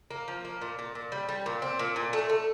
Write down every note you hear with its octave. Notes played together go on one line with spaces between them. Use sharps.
A#3
F3
A#3
A#2
A#2
A#2
G3
G3
A#2
C4
A#2
A#2
A3
A3